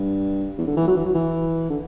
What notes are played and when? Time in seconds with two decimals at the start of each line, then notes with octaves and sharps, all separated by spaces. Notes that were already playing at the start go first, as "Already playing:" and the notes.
Already playing: G2
0.58 E2
0.67 D3
0.77 E3
0.87 F#3
0.97 E3
1.05 F#3
1.15 E3
1.70 D3